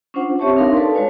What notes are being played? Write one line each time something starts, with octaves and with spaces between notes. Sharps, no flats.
C#4 D4 F4 C5 F#5
C4 G4 C#5 E5 A5 C#6
D4 D#4 A#4 F5 C6
A4 B4 D5 A5
G#3 F#4 B4 C#5 F5 G#5